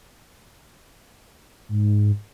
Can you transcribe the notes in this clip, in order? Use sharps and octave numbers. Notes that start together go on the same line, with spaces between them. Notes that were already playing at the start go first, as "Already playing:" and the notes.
G#2